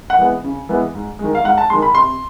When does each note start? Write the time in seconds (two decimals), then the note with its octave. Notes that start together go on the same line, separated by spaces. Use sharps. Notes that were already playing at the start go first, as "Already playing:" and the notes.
0.10 F#5
0.18 E3 G#3 B3
0.44 C#3
0.69 E3 G#3 B3
0.95 G#2
1.19 D#3 G#3
1.35 F5
1.45 G#2 F#5
1.58 A5
1.70 D#3 G#3 C6
1.82 B5
1.95 C3 C6